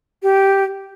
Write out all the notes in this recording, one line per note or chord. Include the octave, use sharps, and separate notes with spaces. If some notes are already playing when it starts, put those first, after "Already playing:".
G4